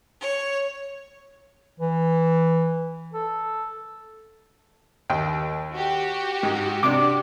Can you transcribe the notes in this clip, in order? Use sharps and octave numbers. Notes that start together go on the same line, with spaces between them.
C#5
E3
A4
D#2 G5
F#4 G4
G#2
C3 D4 D6